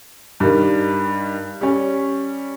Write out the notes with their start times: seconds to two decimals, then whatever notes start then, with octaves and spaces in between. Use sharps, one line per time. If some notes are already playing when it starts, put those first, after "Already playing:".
0.40 G2 D#3 G3
1.61 G3 C#4